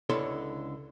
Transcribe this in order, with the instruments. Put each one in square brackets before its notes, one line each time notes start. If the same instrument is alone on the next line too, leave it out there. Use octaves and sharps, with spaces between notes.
[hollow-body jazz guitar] C#2 D3 E4 A4 C#5 C6